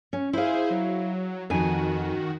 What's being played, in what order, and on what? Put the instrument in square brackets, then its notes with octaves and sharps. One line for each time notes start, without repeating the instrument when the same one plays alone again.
[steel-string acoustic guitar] C#4
[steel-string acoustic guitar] E4 F5 [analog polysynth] G#4 C5
[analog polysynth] F#3
[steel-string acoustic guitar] F2 G#5 [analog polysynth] D#3 F#4